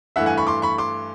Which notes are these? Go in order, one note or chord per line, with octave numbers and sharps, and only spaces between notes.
G2 E3 A3 E5 F#5
F#5 G#5
B5 C#6
C6 D6
B5 C#6
C6 D6